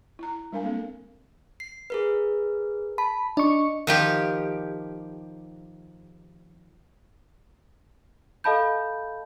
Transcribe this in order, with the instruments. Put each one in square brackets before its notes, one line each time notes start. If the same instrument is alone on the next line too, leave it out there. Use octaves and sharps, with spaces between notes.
[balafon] E4 A#5
G3 G#3 D4 A#4 F5 G#5
A#3 C4 A4
[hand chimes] C7
G#4 A#4 B4
[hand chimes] A5 [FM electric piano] B5
[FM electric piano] D4 C#6 [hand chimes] D#5
[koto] D#3 F3 G4
[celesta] A4 D#5 F5 A5 B5 G6